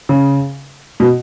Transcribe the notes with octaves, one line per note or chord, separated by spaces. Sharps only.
C#3
B2